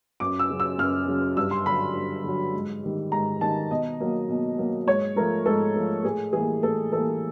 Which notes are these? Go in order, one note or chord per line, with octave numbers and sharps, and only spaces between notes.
F#2 D6
E6
C#3 F#3
E6
F#2 F6
C#3 F#3
G2 E6
C6
D3 F#3 B5
G2
D3 F#3
G#2
D#3 G3
G#2 A#5
D#3 G3 A5
B2 D#5
F#3 A#3
B2
F#3 A#3
G#2 C#5
F3 A3 A#4
G#2 A4
F3 A3
A2 G#4
E3 G3 A#3 G#4
A2 A4
E3 G3 A#3 A4